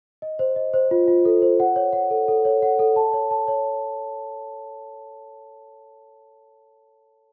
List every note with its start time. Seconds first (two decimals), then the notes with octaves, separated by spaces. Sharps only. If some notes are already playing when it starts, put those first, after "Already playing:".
0.22 D#5
0.39 C5
0.56 D#5
0.74 C5
0.91 F4
1.08 F4
1.25 A4
1.42 C5
1.60 F#5
1.76 C#5
1.93 F#5
2.10 A4
2.28 A4
2.45 C#5
2.62 F#5
2.79 A4
2.96 A5
3.13 C#5
3.31 A5
3.48 C#5